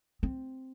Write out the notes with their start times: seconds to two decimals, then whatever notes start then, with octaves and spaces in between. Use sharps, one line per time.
0.23 C4